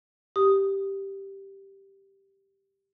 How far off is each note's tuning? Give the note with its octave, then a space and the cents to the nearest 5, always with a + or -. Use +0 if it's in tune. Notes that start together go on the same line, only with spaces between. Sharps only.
G4 +0 D#6 +0